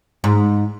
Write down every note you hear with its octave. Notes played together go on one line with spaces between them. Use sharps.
G#2